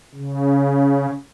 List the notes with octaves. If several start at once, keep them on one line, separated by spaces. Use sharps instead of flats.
C#3